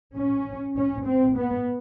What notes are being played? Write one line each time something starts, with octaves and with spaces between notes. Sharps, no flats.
C#4
C#4
C4
B3